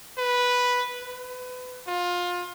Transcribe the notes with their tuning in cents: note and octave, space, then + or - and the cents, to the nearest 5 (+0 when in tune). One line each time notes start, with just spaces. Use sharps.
B4 -5
B4 +30
F4 +25